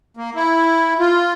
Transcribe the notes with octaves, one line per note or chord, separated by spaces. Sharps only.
A#3
E4
F4